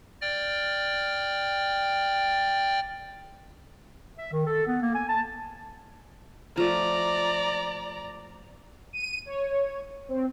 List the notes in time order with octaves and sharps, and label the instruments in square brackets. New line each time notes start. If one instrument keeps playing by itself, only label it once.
[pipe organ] D5 G5 F6
[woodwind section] E5
D#3
A4
B3
A#3
G#5
A5
[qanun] F3 A3 [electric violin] D5 A#5
[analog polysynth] D#7
C#5
C4